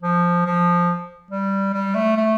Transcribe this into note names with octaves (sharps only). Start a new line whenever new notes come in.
F3
F3
G3
G3
A3
A3